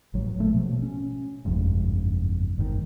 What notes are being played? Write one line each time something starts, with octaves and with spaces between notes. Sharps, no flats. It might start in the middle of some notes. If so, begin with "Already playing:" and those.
A1 F#3
A#2 A3
B2 F3
C#4
G1 C2 F2 G#2
G1 G#2 B2 D#3